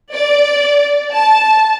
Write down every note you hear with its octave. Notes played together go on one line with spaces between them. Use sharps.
D5
A5